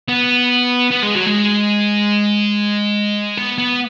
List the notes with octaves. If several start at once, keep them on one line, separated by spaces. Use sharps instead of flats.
B3
B3
G#3
F#3
G#3
B3
B3